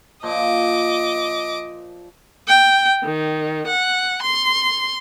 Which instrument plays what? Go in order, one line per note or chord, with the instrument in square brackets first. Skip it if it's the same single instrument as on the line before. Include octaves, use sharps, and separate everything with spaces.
[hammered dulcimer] A#2 F3 C5 [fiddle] D#5 D6
[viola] G5
D#3
F#5
C6